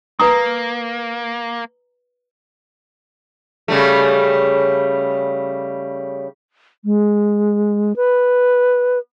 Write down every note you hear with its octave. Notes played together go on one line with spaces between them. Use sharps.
A#3 B4 A#5 D#6
C#3 G3 A3
G#3
B4